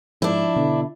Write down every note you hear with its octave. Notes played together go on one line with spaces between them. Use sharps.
G#2 F3 D4 E4
B2 D3 B3